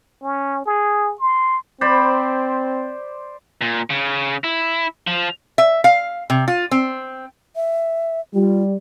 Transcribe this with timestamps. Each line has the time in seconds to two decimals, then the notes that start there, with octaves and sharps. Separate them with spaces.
0.23 C#4
0.66 G#4
1.20 C6
1.81 C4 C5 D5 B5
3.61 A#2
3.90 C#3
4.44 E4
5.07 F3
5.58 E5
5.84 F5
6.30 C3
6.48 F4
6.71 C4
7.56 E5
8.35 G3 F4